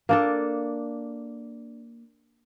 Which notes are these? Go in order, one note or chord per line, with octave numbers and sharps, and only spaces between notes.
A#3 D4 A4